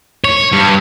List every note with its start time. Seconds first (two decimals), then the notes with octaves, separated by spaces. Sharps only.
0.25 C#5
0.52 G2